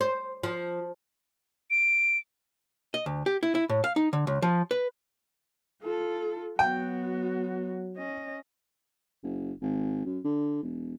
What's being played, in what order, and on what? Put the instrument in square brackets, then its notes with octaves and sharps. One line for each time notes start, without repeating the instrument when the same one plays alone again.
[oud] C5
F3
[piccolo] D7
[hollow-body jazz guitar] D#5
D2
G4
E4
E4
A2
F5
D#4
D3
C#2
F3
B4
[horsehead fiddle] F4 A4
[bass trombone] F#3 [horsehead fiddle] B3 F#4 [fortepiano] G5
[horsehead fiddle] C#4 D#5
[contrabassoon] F#1
G#1
F#2
D3
E1